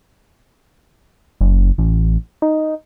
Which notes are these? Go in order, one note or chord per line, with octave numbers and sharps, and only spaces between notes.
F#1
A1
D#4